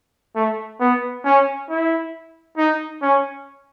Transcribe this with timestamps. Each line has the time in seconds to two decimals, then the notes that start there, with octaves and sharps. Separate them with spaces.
0.36 A3
0.80 B3
1.25 C#4
1.69 E4
2.57 D#4
3.02 C#4